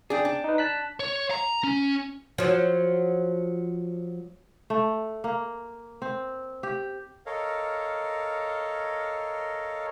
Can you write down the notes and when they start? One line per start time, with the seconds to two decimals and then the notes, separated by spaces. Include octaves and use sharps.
0.10 D4 G#4 D5 G5
0.25 D4
0.44 D#4 B4
0.58 A5 F#6 B6
1.00 C#5
1.31 A#5
1.64 C#4
2.38 F3 F#3
4.70 A3
5.24 A#3
6.02 C4
6.63 G4
7.26 A4 A#4 C#5 D#5 F5